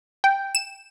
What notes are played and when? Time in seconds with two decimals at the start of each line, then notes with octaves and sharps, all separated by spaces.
0.24 G5
0.55 E7